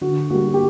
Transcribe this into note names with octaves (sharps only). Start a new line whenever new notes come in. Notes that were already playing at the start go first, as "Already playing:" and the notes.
D3 F#4
G3 A#3 F#4
G4